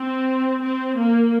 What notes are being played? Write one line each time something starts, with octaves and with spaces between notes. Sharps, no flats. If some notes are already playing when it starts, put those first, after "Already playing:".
Already playing: C4
C4
A#3